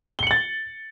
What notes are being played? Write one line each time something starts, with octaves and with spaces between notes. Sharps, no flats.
A6 C#7 F#7 G7